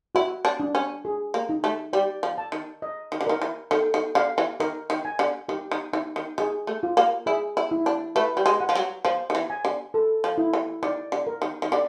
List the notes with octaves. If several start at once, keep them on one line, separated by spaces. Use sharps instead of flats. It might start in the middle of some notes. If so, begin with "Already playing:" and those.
E4 F#4
D4
D4
C#4
G#4
A#3
D#4
A3
G3 D5
F3
A5
D#3
D#5
D#3
D3
D#3 A#4
E3
D#3 A4
D#3
D3 F5
E3
D#3 A#4
D#3
G#5
D3
D#3 G4
D#3
E3 D#4
D#3
D#3 G#4
A3
F4
A#3
E4 G#4
E4
E4
D4
A3 B4
G3
G#3
F#5
F3
F#3
F3 C5
D#3
E3
G#5
D3
A4
F3
E4
E3
D#3 D5
D3
A#4
D#3
D#3
D3 D5